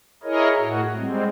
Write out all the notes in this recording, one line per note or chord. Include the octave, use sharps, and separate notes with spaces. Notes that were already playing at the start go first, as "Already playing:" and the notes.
E4 G#4 A#4 C#5 D#5
A2 F#4
G3 G#3 C4